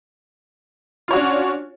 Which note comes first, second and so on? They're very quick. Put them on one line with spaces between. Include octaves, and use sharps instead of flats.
F4 C#5 F#4 D4 C#4